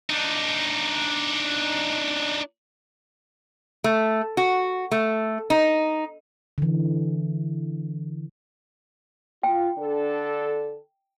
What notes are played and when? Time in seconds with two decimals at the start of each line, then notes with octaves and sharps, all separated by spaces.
0.10 D4 D#4
3.84 A3
4.37 F#4
4.91 A3
5.50 D#4
6.58 D3 E3
9.43 F4 G5
9.78 D3 D4 A4